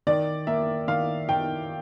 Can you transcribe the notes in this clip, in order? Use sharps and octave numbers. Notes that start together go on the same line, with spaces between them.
D#3 D5
A#3 E5
D#3 F5
D#3 G5